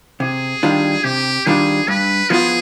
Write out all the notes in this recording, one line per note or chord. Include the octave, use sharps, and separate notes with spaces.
C3 G#4
D#3 G3 D4 F4
C3 G4
D#3 G3 D4 F4 G#4
G2 B4
F3 B3 F4 G#4